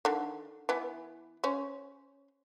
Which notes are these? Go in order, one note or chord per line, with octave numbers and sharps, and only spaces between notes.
D3 D#3
E3 B3
C#4 C5